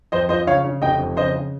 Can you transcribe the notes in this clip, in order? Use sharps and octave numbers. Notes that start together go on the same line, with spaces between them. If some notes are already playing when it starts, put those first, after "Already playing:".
F2 C5 D#5
F3 C5 D#5
C#3 C#5 F5
C#3
F1 D#5 G5
F2
C#3 C5 D#5
C#3